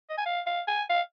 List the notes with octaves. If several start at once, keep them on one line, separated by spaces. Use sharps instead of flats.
D#5
G#5
F5
F5
G#5
F5